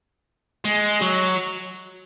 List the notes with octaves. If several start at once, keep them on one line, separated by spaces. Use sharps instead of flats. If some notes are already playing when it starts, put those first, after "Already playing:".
G#3
F#3